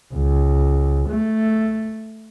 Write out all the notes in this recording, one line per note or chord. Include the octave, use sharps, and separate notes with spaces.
C#2
A3